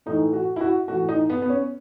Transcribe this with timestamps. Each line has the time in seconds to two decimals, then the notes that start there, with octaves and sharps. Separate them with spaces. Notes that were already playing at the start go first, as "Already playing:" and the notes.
0.06 A2 E3 D#4
0.33 F#4
0.56 E4
0.61 F#4
0.88 A2 F#4
0.92 E3
1.09 D#4
1.30 B3
1.42 B3
1.49 C#4